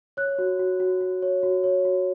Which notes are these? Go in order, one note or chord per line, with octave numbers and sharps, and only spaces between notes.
C#5 F#6
F#4
F#4
F#4
F#4
C#5
F#4
C#5
F#4